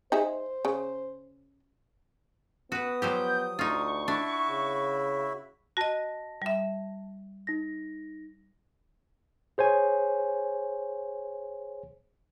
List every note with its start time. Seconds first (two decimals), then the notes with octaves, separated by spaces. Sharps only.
0.12 D#4 G#4 C5 E5
0.65 C#3
2.72 B3 F#4 B4 D#6
3.02 F3 F#3 G4 G6
3.59 D2 D#4 F4 C#6
4.08 D4 E4 F#4 E5
4.49 C#3
5.77 F#4 D#5 A5 A#6
6.42 G3 E5
7.47 D#4 A#6
9.58 G#4 C5 C#5 G#5